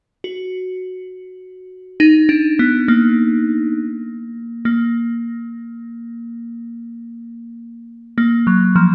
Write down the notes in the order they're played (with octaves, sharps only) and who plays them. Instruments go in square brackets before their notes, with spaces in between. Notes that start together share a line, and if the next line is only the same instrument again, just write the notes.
[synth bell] F#4
D#4
D4
B3
A#3
A#3
A#3
F#3
F3